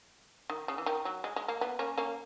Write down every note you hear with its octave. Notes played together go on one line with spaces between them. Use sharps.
D#3
C#3
E3
D#3
F#3
G#3
G#3
A#3
B3
A#3 C#4
A#3 C#4